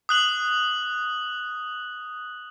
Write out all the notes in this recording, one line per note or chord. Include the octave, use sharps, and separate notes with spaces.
D#6 F#6 F#7